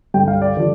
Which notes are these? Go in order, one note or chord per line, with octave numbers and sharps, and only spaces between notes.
G2 D3 G3 G5
F5
D5
D3 F3